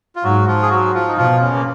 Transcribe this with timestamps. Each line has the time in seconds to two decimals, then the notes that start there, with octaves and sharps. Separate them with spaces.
0.16 F4
0.23 G#2 F#3 F#4
0.47 F3 F4
0.62 G#4
0.70 F#3 F#4
0.93 F3 F4
1.08 D#4
1.17 B2 F3 F4
1.40 C#3 C#4
1.55 A#3